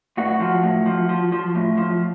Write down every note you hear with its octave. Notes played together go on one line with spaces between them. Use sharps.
A2 F#4
F3
A2
F3
F3
F3
A2
F3